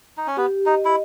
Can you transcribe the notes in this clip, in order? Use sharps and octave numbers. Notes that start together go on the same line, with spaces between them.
D#4
C#4
B3 G4
D#4 D#5
E4